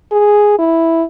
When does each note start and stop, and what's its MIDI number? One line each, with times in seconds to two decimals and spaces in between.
0.12 0.56 68
0.59 1.03 64